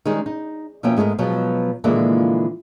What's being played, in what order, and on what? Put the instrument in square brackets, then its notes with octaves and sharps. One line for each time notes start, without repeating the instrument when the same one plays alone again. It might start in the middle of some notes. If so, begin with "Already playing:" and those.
[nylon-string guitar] D#3 G3 G#3 C#4 D#4 G#4
D#4
B2 F3 A#3 C#4 E5 G5
G#2 G#3 A3 G#4 A#4
B2 F3 F#3 G#3
A#2 D3 E3 F3 G#3 A#3